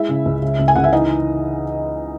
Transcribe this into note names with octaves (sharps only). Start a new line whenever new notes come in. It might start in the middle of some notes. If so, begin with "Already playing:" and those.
Already playing: G#3 E4 E5
C#3
C#2
C#3
C#2
G#5
C#2 F#5
E5
E3 D#4 D#5